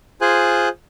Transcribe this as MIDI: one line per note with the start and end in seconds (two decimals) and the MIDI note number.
0.21 0.69 65
0.21 0.69 68
0.21 0.69 72
0.21 0.69 80
0.21 0.69 90